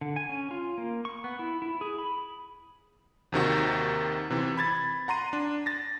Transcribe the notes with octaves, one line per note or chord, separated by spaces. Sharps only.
D3
G#5
C#4
F4
A#3
C#6
B3
E4
E4
G#4
B5
D#2 C3 D#3 F#4
C3 E3 C4
B5 G#6 A6
F#5 A#5 C6 D#7
D4
A6 A#6